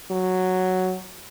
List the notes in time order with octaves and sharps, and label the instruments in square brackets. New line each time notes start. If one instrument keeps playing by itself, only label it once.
[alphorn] F#3